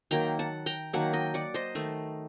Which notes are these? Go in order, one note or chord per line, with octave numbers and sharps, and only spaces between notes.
D#3 F#3 A#3 G5 A#5
F#5 A5
G5 A#5
D#3 F#3 A#3 F#5 A5
D#5 G5
D5 F#5
C5 D#5
D#3 A3